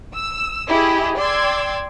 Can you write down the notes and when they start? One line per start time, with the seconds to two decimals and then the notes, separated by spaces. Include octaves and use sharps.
0.14 E6
0.69 E4 G4 G#4 D#5
1.18 D5 G5 C6 D6 E6 G#6